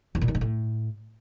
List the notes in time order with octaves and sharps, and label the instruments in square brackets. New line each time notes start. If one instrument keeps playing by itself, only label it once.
[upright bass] E2
A#2
D#3
G#2
A2